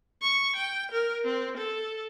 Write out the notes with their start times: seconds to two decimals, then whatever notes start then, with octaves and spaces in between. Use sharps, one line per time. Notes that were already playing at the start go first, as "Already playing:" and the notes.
0.22 C#6
0.56 G5
0.91 A#4
1.25 C4
1.57 A4